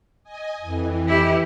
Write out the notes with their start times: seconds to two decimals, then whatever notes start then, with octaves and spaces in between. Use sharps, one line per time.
0.24 D#5 G#5
0.61 F2 E3
1.08 E4 G4